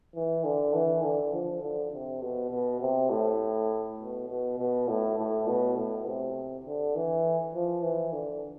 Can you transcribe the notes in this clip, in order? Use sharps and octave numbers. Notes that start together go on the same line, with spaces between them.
E3
D3
E3
D3
F3
D3
C3
B2
B2
C3
A2
B2
B2
B2
A2
A2
B2
A2
C3
D3
E3
F3
E3
D3